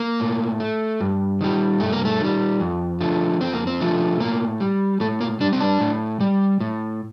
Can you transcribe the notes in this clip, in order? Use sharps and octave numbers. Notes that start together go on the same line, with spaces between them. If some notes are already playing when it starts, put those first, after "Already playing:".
Already playing: A#3
A2
A3
G2
D#3 G3
G2 A3
A#3
A3
D#3 G3
F2
D3 F3 A3
F2 C4
A#3
C4
D3 F3 A3
A2 A#3
G3
A2 A3
A#3
G3 D4
C4
D4
A2
G3
A2